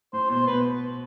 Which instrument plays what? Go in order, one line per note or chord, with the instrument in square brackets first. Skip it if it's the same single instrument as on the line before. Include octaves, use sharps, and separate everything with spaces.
[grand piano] A2 [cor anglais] C5
[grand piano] B2 [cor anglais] C5
[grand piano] B2 [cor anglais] B4